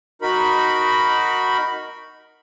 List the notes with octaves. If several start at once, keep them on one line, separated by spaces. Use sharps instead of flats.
D#4 F#4 A#4 B5